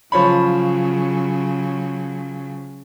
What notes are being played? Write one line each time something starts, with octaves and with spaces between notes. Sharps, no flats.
C#3 F3 F#3 C#5 B5